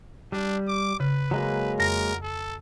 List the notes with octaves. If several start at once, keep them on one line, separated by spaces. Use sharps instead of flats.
G3 D4
D6
C#3 B4
F#3 G#3 A#3
F2 A#4 A#6
A4